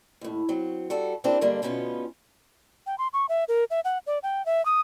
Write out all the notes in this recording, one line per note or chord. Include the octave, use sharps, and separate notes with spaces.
D#2 A2
F#3 C4
G3 F#4 A4
A#3 C4 D4 E4 G4 C5
G2 D3 G3 G#3 A#3 D4
D2 B2 B3 C#4 D#4 F4
G5
C6
C#6
E5
A#4
E5
F#5
D5
G5
E5
D#6